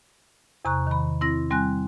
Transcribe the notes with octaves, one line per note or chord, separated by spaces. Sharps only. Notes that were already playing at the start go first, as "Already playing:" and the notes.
E2 C3 A#5 C#6 F#6
D#3 B5
C4 E4 A#6
G3 C4 G#5 F#6